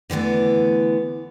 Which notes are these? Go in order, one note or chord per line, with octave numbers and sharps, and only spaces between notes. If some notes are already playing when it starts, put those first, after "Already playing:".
D3 E3 A3 B3